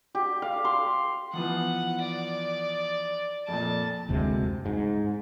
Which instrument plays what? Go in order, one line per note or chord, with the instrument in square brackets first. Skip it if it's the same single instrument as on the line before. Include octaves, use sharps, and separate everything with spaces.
[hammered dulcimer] G4
F5
C6
[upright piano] E3 F3 B3 [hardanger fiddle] F#5
[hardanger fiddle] D5
[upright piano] F2 A#2 [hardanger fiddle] A5
[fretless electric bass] F#1 D2 C3 G#3
G#2